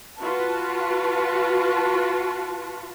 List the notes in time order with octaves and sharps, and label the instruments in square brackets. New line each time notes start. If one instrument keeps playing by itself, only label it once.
[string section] F4 F#4 B4 A5